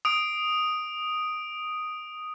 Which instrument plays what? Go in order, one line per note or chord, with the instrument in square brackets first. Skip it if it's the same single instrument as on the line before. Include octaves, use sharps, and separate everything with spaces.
[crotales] D#6 D7